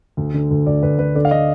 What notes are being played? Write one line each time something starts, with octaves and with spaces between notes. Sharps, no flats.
D2
D3
D2
D2 D5
D2 B4
D2 B4
D3 D5
F5
D3 D#5